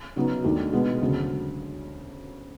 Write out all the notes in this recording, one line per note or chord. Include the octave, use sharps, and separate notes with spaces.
C#3 F#3 B3 D#4
D#2 D#3 F#3 A3 D4
B2 G#3 B3
D2 C#3 F#3